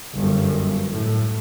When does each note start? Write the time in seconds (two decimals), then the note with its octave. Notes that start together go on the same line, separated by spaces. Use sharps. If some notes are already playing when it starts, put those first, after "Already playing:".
0.15 G1 F#2
0.91 A2